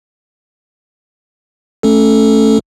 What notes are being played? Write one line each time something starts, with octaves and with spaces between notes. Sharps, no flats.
A3 C#4 A4